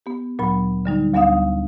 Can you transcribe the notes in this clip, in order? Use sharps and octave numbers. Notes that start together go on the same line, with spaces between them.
B3 G4
D2 A#2 F#3 B5
D3 G3 D#4
D2 G3 B3 D4 F5 D#6